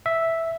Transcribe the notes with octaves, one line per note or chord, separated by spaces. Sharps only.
E5